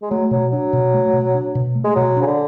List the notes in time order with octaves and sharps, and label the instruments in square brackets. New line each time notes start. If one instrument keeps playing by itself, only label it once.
[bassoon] G#3
[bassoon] F#3 [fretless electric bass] A3
[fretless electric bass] B2 [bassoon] F#3
[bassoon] F#3 [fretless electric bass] D4
[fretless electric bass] B2
A3
B2
D4
B2
A3
[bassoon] G#3
[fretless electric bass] B2 [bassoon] F#3
[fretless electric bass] D4
[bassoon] C#3
D3